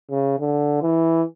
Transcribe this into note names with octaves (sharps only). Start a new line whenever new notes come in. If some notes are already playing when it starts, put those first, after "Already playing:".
C#3
D3
E3